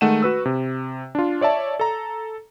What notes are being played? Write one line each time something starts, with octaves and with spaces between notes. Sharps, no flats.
D#3 G#3 A3 F#5 D#7 E7
F#4 B4 E6
C3
D4 F4
C#5 D5 E5 A5
A4 A#5